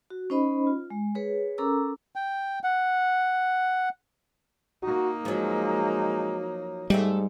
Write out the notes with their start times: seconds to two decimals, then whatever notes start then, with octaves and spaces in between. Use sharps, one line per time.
0.10 F#4
0.30 C#4 D#4 C5 D#5 B5
0.67 F4
0.90 G#3
1.15 G#4 B4 C#5
1.58 C#4 A4 A#4 A#5 D6 E6
2.16 G5
2.64 F#5
4.83 A#3 D#4 F#4
5.25 F3 F#3 G#3
6.90 G#2 G3 A3 D#4 G4